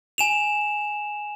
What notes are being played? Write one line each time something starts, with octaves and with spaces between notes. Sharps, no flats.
G#5 E7 F7